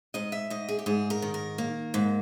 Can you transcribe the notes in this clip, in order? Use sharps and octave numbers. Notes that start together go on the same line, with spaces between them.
G#2 D#5
E5
G#2 D#5
G#4
G4
G#2 G#4
A#4
D#3
A#4
A#3
G#2